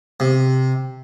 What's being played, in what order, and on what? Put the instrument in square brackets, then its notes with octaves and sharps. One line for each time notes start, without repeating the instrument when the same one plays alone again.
[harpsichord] C3